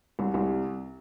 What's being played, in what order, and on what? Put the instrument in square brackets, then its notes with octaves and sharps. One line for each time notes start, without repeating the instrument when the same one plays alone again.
[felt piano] C2
C2